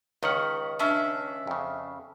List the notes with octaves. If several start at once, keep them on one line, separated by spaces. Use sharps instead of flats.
C#2 D#3 C#4 F#5
C#4 D4 E5
F2 C#3